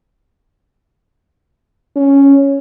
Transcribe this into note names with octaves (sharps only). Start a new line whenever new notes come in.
C#4